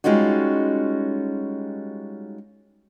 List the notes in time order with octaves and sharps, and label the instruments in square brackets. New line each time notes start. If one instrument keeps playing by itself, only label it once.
[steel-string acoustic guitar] G3 G#3 C#4 D#4 F4 F#4